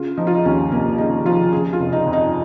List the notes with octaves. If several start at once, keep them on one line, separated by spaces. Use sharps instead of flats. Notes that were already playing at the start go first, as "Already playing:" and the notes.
Already playing: C#3 F4
F3 D#4
F4
D#4
D#2 C#4
F1 A#3
C#3 D#4
F3 F4
C#3 G#4
F4
F1
D#4
F2
D#4